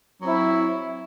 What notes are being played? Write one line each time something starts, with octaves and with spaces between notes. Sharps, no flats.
F#3 C4 E4